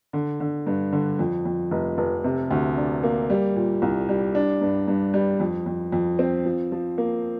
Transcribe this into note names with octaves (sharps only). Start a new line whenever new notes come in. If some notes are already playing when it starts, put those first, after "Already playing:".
D3
D3
G2
D3
F2
F2
F1
F1
C3
D2
D4
A#3
G3
A#2
C2
G3
D4
G2
G2
G3
F2
F2
F2
C4
F3
F3
A#3